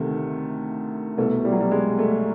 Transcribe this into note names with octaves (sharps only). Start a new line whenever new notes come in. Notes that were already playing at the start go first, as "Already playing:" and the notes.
Already playing: D2 C3 D#3 A3
C2 B2 A3
G3
F#3
G3
G#3
A3